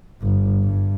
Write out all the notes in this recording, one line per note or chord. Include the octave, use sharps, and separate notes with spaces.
G1
G2